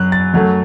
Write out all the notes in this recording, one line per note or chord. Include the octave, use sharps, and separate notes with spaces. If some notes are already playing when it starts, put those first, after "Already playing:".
Already playing: F#2 F#3 F#6
A6
F#2 F#3 A3